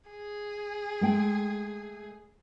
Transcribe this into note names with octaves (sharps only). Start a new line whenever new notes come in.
G#4
G#3 A3 G5